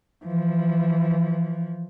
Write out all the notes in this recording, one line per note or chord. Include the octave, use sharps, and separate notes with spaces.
E3 F3